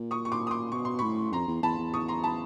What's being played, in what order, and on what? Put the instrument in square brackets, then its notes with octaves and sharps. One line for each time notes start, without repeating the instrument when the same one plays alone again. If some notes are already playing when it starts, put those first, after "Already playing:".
Already playing: [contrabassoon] A#2
[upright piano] C#6 D#6
C#6
C6 D6
D#6
C6 D6
[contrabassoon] B2 [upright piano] C#6
[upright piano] C6
[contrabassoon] A2 [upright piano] B5 C#6
[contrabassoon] F2 [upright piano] A#5 C6
[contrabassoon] E2
[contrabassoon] E2 [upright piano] A5 B5
[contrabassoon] E2
[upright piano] C#6 D#6
A#5 C6
A5 B5